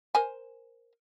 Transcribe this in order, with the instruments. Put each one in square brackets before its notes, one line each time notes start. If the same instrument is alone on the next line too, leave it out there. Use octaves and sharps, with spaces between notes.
[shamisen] A#4 C5 G#5